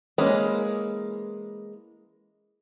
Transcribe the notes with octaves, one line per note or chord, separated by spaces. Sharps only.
E3 G#3 A#3 C#4 B5